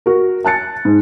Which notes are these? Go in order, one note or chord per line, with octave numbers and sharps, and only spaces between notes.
F#4 A#4
A5 F#6 A6 C#7
G#2